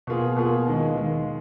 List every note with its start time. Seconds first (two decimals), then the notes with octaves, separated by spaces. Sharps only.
0.07 B2 A#3 F4 G#4
0.36 B2 A#3 F4 G#4
0.66 D#2 D#3 G#3
0.96 D#2 D#3 G#3